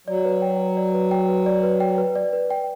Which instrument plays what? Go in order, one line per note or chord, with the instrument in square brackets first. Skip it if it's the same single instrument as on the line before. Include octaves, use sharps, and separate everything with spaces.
[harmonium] F#3 [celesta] D5
[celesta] B4
G5
B4
D5
B4
G5
B4
D5
B4
G5
B4
D5
B4
G5